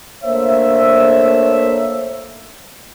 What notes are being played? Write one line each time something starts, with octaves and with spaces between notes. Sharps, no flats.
A3 A#3 D4 C5 C#5 E5